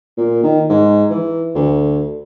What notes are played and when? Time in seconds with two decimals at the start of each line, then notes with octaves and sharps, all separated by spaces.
0.17 A#2
0.43 D#3
0.70 G#2
1.10 E3
1.55 D2